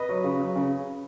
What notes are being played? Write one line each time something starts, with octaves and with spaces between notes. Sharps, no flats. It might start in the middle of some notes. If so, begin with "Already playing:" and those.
Already playing: B4 D#5
F#3
C#3
F#3
C#3